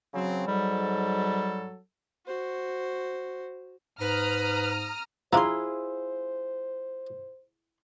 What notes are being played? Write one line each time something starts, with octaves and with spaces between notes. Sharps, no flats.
C#3 F#3 C4
G#2 F#3 G3 A4
F#4 C5
G#2 B4 A#5 D#6 F6
F3 D4 E4 F4 G#4 C5 A#5 C6